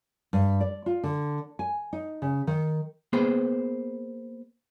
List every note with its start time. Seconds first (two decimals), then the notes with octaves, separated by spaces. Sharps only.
0.33 G2
0.61 D5
0.86 F4
1.04 D3
1.59 G#5
1.93 D#4
2.22 C#3
2.47 D#3
3.13 A#3 B3 G#4 B4 C5